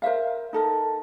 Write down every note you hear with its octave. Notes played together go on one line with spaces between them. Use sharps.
A#4 C5 E5 F5
D#4 A4 A#4